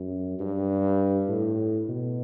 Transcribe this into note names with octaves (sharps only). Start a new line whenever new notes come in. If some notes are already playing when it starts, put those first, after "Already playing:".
Already playing: F#2
G2
A2
B2